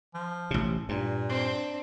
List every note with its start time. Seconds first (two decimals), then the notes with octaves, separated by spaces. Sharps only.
0.14 F3
0.51 A1 C3
0.89 G2 A#2
1.29 C4 D4